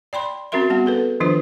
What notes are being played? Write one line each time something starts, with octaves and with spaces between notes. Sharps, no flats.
D5 G5 B5 C6
C4 C#4 F#4 A#4 E5 C6
G3 B3 F#4 F#5
G#4 A4 B4
D#3 F3 D4 F4 B4